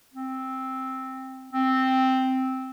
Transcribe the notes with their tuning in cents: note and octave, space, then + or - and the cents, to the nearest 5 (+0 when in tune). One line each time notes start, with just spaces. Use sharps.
C4 +5
C4 +0